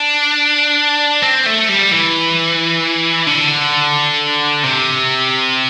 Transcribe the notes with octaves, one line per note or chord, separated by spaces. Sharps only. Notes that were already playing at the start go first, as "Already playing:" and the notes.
Already playing: D4
C4
A3
G3
E3
D3
C3